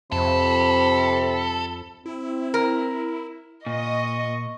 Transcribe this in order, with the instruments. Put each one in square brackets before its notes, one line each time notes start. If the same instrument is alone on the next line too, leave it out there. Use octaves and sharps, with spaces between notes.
[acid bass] F2 [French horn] C3 [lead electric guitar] A4 [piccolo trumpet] B5
[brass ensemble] C4 [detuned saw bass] E4
[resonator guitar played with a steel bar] A#4
[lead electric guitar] A#2 [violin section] D#5 [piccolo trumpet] C#6